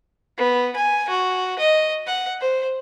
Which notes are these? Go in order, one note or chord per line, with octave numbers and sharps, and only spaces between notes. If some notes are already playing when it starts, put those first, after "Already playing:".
B3
G#5
F#4
D#5
F#5
C5